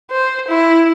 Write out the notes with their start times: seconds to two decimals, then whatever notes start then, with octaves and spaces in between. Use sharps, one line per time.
0.11 C5
0.48 E4